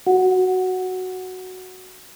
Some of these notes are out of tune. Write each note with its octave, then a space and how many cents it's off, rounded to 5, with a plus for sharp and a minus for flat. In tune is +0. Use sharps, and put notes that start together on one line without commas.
F#4 +0 F#5 +0